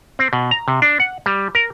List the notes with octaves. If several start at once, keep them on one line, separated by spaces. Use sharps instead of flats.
C4
B2
A#5
C3
D4
F#5
G3
A#4